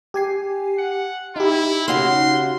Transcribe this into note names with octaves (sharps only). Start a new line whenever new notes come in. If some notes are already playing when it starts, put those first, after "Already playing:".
G4 G#5 C7
F#5 C#7
D#4 E4 G4
C#3 F#4 F5 C6